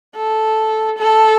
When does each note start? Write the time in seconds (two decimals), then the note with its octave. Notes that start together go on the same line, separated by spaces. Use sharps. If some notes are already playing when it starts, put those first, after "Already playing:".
0.15 A4
0.98 A4